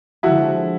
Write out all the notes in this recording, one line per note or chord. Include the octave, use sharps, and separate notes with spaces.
D3 F3 G#3 E4 F#4